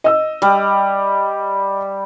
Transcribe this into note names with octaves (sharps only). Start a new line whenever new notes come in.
D#5 E6
G3